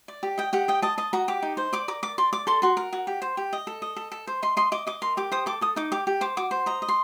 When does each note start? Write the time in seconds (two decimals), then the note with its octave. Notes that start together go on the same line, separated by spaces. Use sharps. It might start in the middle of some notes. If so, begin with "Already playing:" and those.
0.08 D5
0.23 G4
0.38 D#5 G5
0.53 G4 F#5
0.68 D#5 G5
0.82 D#5 A5
0.98 D#5 A5
1.13 F#4 A#5
1.28 G4 D6
1.42 D#4
1.57 C5
1.73 D5 D6
1.88 A#4 D6
2.03 D5 D6
2.18 D5 C6
2.33 D5 D6
2.47 A4 C6
2.62 F#4 C6
2.77 A#4
2.93 F#4
3.07 G4
3.22 C5
3.37 G4
3.53 D#5
3.67 A4
3.82 D#5
3.96 A4
4.12 A4
4.27 C5
4.42 D#5 C6
4.57 D#5 C6
4.72 D#5 D6
4.87 D#5 D6
5.02 A#4 C6
5.17 G4 D6
5.32 C5 D#6
5.46 A4 D6
5.61 A4 D#6
5.76 D#4 D6
5.92 G4 D6
6.07 G4
6.21 C5 D6
6.37 F#4 D6
6.51 C5
6.66 D#5 A#5
6.82 D#5
6.88 C6